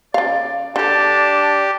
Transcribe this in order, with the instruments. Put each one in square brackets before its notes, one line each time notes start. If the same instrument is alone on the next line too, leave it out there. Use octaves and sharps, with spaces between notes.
[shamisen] C#3 F5 [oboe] D5
[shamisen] D3 A4 [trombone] D4 [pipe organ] G4 [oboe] A5